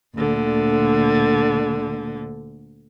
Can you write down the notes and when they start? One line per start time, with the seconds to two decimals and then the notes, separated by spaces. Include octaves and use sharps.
0.16 D2 A#2 D3